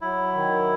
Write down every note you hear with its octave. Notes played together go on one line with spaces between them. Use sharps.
F#3 E4
D#3